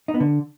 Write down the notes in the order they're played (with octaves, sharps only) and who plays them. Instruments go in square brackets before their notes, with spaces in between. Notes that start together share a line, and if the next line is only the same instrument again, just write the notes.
[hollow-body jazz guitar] D#4
B3
D3